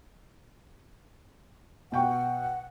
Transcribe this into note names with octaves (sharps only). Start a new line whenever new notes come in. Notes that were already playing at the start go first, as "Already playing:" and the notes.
B2 F#5 G5 C#6